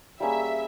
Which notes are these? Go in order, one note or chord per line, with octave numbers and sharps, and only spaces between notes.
G3 A#3 C#4 G#4 E5